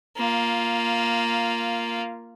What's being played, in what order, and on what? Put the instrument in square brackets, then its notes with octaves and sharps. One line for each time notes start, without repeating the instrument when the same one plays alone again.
[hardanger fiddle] A#3 F4